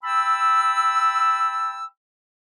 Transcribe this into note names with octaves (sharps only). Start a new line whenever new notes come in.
G5 A5 B5 E6